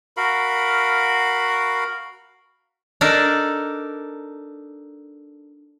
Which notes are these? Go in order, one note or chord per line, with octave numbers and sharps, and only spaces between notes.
F#4 A#4 F5 B5
D4 D#4 A4 A#4 D5